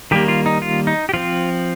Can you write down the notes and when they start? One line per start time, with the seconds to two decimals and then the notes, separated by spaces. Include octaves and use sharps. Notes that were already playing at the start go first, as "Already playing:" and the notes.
0.11 D#3 G3 A#3 G4
0.28 F4
0.46 D#4
0.62 F4
0.87 D#4
1.09 G4
1.14 F3 C4 F4